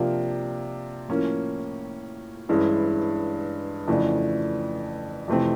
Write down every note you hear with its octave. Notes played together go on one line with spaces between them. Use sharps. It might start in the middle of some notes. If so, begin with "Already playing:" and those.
Already playing: C3 F3 A#3 D4 F4
A2 F3 A#3 C#4
G2 E3 G#3 C#4 E4
F2 C#3 E3 A3 D4
F2 C3 E3 A3 C4